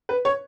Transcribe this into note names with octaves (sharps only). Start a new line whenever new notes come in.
B4
C#5